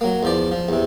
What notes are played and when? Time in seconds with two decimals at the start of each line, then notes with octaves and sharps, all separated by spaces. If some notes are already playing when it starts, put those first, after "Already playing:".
0.01 F#3 A#3
0.23 E2 F3 D5
0.51 F3
0.69 E2 C3